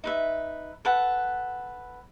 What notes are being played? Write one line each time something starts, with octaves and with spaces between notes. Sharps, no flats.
D#4 B4 E5
A4 B4 F#5